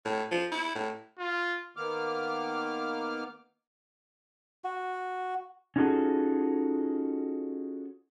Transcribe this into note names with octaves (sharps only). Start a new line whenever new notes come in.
A2
F3
E4
A2
F4
D#3 A#3 B3 D6 F6
F#4
C#4 D#4 F4 F#4 G#4 A4